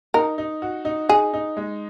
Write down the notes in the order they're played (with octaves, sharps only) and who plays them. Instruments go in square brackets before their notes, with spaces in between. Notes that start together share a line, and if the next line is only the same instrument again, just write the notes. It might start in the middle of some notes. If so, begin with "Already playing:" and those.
[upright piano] D#4 [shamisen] A#4
[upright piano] D#4
F#4
D#4
[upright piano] D#4 [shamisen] G#4
[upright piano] D#4
G#3